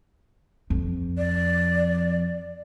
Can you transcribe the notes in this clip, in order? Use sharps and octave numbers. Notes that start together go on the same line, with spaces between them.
F2
D5